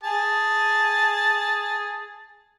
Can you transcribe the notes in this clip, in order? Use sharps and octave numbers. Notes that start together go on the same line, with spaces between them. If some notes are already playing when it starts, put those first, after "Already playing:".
G#4 A5